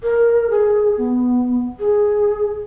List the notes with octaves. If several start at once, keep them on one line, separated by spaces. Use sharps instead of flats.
A#4
G#4
B3
G#4